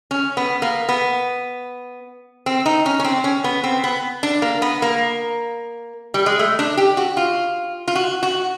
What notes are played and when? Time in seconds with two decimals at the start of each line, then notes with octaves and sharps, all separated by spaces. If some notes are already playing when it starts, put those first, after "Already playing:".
0.11 C#4
0.37 B3
0.62 A#3
0.89 B3
2.46 C4
2.66 D#4
2.86 C#4
2.99 C#4
3.04 C4
3.24 C#4
3.44 B3
3.64 C4
3.84 B3
4.23 D4
4.42 A#3
4.62 B3
4.82 A#3
6.14 G3
6.26 G#3
6.39 A3
6.59 D4
6.77 G4
6.97 F#4
7.17 F4
7.88 F4
7.95 F#4
8.23 F#4